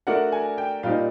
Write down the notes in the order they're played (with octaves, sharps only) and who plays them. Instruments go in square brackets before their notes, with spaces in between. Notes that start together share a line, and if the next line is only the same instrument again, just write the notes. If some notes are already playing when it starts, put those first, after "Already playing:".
[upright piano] A3 D4 F#4 A#4 D5 [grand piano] F#5
[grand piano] G#5
G5
[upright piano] A#2 G3 C4 D#4 [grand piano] F5